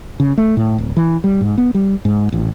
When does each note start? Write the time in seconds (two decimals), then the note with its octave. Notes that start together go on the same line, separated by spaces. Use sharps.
0.20 C#3
0.38 A3
0.57 A2
0.78 D1
0.97 E3
1.24 G3
1.41 G#2
1.58 B3
1.75 G3
2.05 G#2
2.32 A1